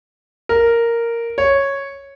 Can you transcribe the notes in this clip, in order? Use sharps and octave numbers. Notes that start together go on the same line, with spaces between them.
A#4
C#5